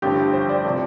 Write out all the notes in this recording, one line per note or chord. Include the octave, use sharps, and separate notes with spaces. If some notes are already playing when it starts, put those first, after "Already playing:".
A1 G2 D3 F3 G4
C5
D5
C3 F3 D5